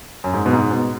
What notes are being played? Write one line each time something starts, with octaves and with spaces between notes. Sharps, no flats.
F#2
G#2
B2
G#2
B2